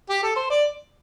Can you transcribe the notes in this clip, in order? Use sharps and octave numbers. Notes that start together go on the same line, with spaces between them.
G4
A4
C5
D5